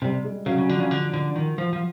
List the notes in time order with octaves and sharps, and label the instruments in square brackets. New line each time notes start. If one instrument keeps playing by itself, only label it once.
[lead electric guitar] C3 [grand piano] G3
[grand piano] G#3
[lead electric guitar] C#3 [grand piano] F#3
[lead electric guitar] C#3
[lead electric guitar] D3 [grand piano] F3
[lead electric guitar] C#3
D3
D3
D#3
F3
F3